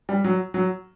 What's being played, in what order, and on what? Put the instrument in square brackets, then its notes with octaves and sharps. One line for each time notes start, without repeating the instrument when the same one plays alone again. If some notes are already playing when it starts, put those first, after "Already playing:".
[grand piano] G3
F#3
F#3